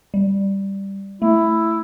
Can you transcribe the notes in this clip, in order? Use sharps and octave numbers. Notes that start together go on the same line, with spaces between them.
G3
A3 E4